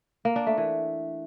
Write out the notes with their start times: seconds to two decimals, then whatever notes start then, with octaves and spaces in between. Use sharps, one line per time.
0.25 A#3
0.36 D4
0.47 A3
0.57 E3